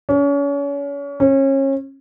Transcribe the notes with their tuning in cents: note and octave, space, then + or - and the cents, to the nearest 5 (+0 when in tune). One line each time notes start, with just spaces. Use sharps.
C#4 +35
C#4 -30